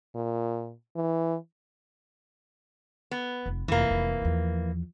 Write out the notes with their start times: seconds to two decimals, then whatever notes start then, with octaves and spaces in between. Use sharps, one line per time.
0.15 A#2
0.96 E3
3.11 B3
3.46 F1
3.68 F1 E3 A#3
3.91 F1
4.22 E2 F3